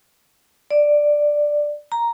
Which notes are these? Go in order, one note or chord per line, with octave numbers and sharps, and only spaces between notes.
D5
A#5